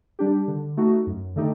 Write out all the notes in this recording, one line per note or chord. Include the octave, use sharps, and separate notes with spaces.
G3 D4 G4
D3
A3 D#4 F#4
F#2
D3 A3 D#4 G4